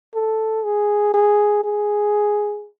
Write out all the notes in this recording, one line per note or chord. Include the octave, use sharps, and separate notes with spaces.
A4
G#4
G#4
G#4